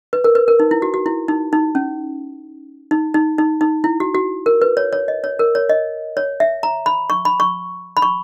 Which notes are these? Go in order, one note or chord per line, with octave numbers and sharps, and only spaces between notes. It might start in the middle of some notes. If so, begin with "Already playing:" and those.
B4
A#4
B4
A#4
D#4
E4
F#4
F#4
E4
D#4
D#4
C#4
D#4
D#4
D#4
D#4
E4
F#4
F#4
A#4
B4
C#5
C#5
D#5
C#5
A#4
C#5
D#5
C#5
E5
A#5
B5
C#6
B5
C#6
B5
C#6